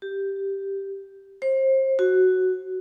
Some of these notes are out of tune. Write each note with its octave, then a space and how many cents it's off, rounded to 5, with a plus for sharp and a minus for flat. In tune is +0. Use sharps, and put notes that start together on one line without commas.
G4 +0
C5 +30
F#4 +5